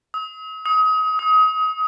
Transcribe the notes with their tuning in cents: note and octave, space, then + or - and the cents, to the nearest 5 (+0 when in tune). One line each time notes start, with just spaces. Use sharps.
D#6 +45
D#6 +30
D#6 +25